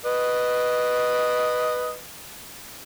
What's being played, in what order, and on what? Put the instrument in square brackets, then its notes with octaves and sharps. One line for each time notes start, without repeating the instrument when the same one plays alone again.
[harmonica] B4 D#5